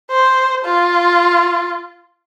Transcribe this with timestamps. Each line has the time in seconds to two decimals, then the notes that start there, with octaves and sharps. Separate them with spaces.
0.11 C5
0.65 F4